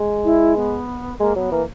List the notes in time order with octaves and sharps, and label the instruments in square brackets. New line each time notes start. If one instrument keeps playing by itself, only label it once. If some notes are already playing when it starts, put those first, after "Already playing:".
Already playing: [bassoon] G#3
[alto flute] E4
B3
[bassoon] G#3 [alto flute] A#3
[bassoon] F#3 [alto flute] B3
[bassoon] E3 [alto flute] A#3